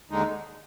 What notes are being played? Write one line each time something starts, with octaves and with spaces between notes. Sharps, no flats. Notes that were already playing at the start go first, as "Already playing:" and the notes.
D#2 D3 G#3 D#4